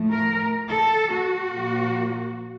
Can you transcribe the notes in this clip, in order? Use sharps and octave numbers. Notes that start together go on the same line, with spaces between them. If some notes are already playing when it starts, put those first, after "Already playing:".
Already playing: A2 F3 A3
A#4
A4
F#4
A#2 F3 A#3